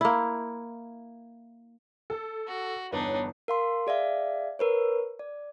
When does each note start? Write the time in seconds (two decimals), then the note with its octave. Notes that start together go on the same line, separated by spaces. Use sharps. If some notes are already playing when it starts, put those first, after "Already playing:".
0.01 A#3 E4
2.10 A4
2.48 F#4
2.93 G1 E2 D4 D#4 B4 C#5
3.48 A#4 F5 C6
3.87 G#4 D5 E5 F5
4.59 A#4 B4 C#5
5.19 D5